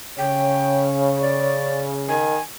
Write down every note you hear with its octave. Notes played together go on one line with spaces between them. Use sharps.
C#3 C#5 G5
D5
D#3 G#5